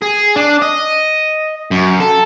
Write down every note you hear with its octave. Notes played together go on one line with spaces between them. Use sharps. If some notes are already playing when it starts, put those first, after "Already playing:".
G#4
D4
D#5
F#2
A4